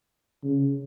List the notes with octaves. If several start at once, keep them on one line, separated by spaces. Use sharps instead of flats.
C#3